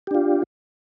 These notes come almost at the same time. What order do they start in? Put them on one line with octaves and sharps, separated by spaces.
G4 D4 F4